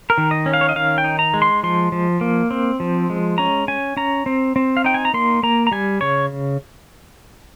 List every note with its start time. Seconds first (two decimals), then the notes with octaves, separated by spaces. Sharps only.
0.10 A#4
0.18 D#3
0.31 D#5
0.46 C#4
0.54 F5
0.61 C#5
0.69 D#5
0.76 D#3 F5
0.98 G5
1.04 D#4
1.19 A#5
1.34 G#3
1.42 C6
1.63 F3 C6
1.92 F3
2.21 A#3
2.51 C4
2.80 F3
3.10 G#3
3.38 C#4 A#5
3.68 C#4 G#5
3.97 C#4 A#5
4.26 C4
4.56 C4
4.77 F5
4.84 D#4 G5
4.94 G#5
5.05 A#5
5.14 A#3 C6
5.43 A#3 A#5
5.67 A#5
5.72 G3 G#5
6.01 C#3 C#5